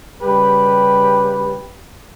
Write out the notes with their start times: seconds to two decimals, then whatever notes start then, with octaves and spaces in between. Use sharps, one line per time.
0.22 C#3 G3 G4 B4